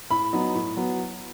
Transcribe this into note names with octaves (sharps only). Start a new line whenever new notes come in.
A2 B5
F#3 B3 D#4
A2
F#3 B3